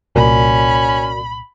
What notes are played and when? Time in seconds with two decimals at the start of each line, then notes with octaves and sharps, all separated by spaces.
0.16 C2 A#2 C#4 F#4 A#4 D5 B5